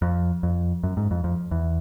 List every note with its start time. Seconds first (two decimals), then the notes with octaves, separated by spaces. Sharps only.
0.02 F2
0.43 F2
0.83 F#2
0.97 G#2
1.11 F2
1.24 F2
1.51 E2